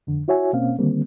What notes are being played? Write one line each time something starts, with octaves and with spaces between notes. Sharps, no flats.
F2 D3
E4 F#4 C#5 E5 G#5
B2 A#3 C4 C#4 F5
D3 D#3 G3 A#3 C4